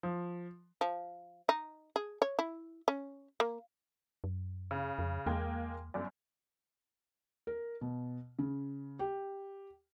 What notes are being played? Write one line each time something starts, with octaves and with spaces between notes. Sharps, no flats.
F3
F3
D#4
G#4
C#5
E4
C#4
A#3
F#2
C#3
F2
E2 G#3 A#3 G5
G1 F#2 D5
A#4
B2
C#3
G4